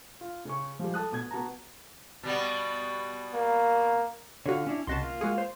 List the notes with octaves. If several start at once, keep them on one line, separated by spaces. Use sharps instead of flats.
F4
C#3 C#4 C#6
F3 G3 G#3
A4 A5 D#6 F#6
B2 D#6 G#6
B3 F#4 A5 A#5
B2 G3 B3
A#3
D3 F4 F#4 C#5
C#4 D4 E4
C2 C#3 F#4 D#5 A5 C6
A#3 F4
G#3 F#4 G#4
C5